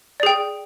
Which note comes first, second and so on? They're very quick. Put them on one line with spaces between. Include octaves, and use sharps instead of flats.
D5 G#4 G5